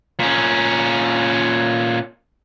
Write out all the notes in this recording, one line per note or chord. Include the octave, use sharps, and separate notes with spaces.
A#2 C#4